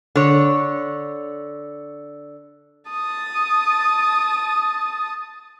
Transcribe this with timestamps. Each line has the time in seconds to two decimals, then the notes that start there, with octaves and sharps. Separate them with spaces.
0.15 D3 C#5
2.91 A5 D#6